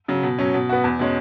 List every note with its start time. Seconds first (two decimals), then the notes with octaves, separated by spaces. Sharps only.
0.08 C#3 F#3
0.23 B2
0.38 F#3 C#4
0.54 B2
0.69 B3 F#4
0.84 E2
0.99 B2 G#3 C#4